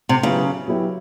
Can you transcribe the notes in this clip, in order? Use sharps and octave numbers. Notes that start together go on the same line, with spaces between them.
C3
C#3 F#3 B3 E4 G4
F#3 B3 E4 G4